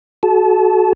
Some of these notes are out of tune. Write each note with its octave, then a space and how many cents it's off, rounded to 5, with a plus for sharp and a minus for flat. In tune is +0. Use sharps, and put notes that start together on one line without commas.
F#4 +5 A4 -40 A5 -25